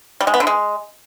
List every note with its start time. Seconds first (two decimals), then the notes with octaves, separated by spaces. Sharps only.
0.21 G3
0.27 G#3
0.34 B3
0.40 D3
0.47 G#3